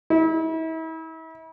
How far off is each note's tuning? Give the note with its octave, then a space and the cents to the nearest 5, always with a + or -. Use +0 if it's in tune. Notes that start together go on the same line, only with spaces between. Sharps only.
E4 -40